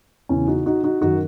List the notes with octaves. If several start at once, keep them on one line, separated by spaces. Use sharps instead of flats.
E2 C#3 E3 C#4 E4
D#4 F#4
D#4 F#4
D#4 F#4
F#2 D#3 D#4 F#4